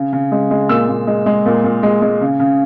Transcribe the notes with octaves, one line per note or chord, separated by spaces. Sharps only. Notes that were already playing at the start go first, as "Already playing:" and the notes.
Already playing: C#3
C#3
G#3
G#3
A#2 E6
A#2
G#3
G#3
A#2
A#2
G#3
G#3
C#3
C#3